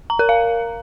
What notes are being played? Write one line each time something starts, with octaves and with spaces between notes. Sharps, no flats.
A#5
A#4
F5